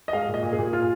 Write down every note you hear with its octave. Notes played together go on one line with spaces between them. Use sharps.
D#5
G#3 F5
A#2
D#5
A#2
G#4
A#2
A#2 F4